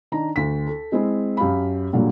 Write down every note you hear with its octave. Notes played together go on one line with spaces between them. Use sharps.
D#3 D4 A#5
D2 B6
A4
G#3 C4 E4 G#4
F#2 G4 F5 B5
A#2 D3 F#3 G3 A#3